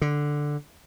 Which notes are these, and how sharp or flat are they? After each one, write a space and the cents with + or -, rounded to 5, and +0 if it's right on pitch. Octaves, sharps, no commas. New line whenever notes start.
D3 +0